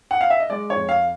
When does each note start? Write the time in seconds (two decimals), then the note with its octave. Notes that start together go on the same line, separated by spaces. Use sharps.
0.11 F#5
0.21 F5
0.30 E5
0.40 D#5
0.50 G#3 D5
0.70 C#5
0.76 F2
0.89 F5